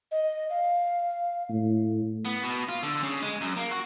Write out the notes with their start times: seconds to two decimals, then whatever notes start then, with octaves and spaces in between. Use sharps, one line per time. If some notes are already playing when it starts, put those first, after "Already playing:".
0.11 D#5
0.50 F5
1.49 A2
2.25 B3
2.43 B2
2.69 F4
2.83 D3
3.03 C#3
3.22 G#3
3.41 F#2
3.57 A#3
3.71 F#4